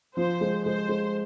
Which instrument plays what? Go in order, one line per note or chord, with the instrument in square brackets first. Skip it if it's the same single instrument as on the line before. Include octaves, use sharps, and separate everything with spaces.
[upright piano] F3 [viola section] C5
[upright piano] G#3
[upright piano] G#3 [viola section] C5
[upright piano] G#3